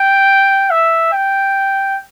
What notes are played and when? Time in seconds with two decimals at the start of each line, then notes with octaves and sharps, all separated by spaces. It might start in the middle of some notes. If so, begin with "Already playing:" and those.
Already playing: G5
0.70 E5
1.13 G5